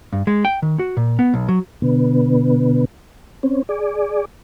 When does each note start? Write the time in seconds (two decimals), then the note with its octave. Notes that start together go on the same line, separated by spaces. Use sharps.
0.13 G2
0.27 G#3
0.45 G5
0.62 D#3
0.79 F#4
0.97 A#2
1.19 B3
1.34 B1
1.48 F#3
1.82 B2 D3 B3
3.43 C4 C#4
3.69 G#4 D5